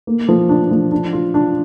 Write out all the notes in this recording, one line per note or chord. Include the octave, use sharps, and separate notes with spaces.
A#3
F3
D4
F3
D4
F4
D4